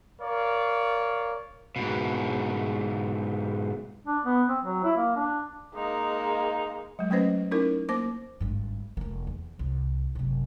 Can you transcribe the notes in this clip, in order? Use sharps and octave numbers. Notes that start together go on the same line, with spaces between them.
A#4 C#5 D5 F5
G#2 B2
D4
B3
C4
F#3
E4
A#3
D4
G#3 A#3 D#4
F#3 G#3
F#3 A3 C#4 B4 C5 D#5
C#4 D#4 E4 A#4 C#5
A#3 C5 D6
G#1 G2
F1 A#3
E2
C2
F#1 C3